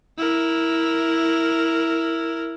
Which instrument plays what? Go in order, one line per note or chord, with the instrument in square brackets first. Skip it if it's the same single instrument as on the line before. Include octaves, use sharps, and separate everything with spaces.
[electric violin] E4 A#4